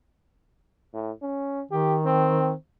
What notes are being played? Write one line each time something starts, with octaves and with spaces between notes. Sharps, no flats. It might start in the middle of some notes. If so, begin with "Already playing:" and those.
A2
C#4
D#3 G4
C4